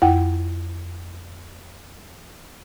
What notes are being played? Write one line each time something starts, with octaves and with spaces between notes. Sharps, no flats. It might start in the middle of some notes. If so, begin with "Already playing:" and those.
F2 E4 F#5 G5